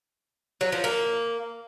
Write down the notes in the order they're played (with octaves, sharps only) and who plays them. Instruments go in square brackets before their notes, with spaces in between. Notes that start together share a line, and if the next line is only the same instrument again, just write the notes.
[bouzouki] F#3
F3
A#3